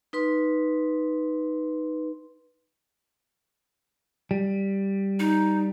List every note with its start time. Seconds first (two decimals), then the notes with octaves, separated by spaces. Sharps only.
0.13 D#4 B4 C6
4.31 G3
5.20 D#4